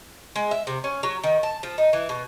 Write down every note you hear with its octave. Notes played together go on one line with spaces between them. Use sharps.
G#3
E5
C3
C#4
F#3
D#3
A5
F3
D#4
E3
B2